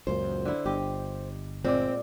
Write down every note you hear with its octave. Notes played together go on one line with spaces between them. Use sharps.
C#2 F#2 A#2 C5
D3 E4
G1 G4 D#5
A#2 G#3 C4 D5